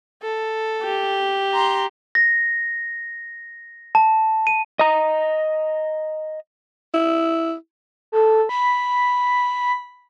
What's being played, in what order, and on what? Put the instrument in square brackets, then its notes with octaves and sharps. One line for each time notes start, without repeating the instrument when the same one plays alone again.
[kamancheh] A4
[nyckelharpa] G4
[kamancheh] A#5 C6
[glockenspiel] A#6
A5
D#7
[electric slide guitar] D#5 A#5
[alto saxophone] E4
[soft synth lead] A4
B5